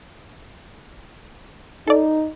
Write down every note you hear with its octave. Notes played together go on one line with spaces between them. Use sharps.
D#4 A4 D5